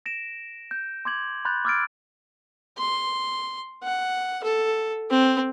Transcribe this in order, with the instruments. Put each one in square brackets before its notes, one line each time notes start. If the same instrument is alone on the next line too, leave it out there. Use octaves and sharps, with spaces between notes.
[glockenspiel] A#6 D7 E7
G6
C6 D6 G#6 F#7
B5 C6 F#6 G6 A6
D6 E6 F6 G#6 A6 D7
[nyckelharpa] C6
F#5
A4
C4